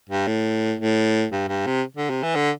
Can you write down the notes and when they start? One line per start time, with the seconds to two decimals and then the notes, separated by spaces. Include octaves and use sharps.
0.09 G2
0.27 A2
0.79 A2
1.32 G2
1.48 G2
1.67 C3
1.96 D3
2.10 C3
2.23 E3
2.35 D3